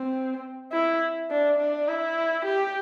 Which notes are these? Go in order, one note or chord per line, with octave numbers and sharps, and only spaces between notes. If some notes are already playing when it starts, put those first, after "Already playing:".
Already playing: C4
E4
D4
D4
E4
G4